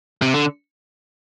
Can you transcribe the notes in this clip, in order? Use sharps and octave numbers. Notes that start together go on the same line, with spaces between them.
C3
D3